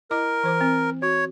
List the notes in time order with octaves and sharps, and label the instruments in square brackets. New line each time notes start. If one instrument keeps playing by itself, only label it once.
[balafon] E4 D#5 D6 [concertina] A#4
[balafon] E3 C5 D6
C4
[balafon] F#4 [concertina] C#5